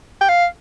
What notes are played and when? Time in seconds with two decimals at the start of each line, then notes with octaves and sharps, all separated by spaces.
0.21 G5
0.29 F5